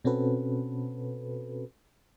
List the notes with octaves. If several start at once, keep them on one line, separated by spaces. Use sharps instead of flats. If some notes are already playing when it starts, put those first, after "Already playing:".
B2 C4 C#4 F#4 A4 B4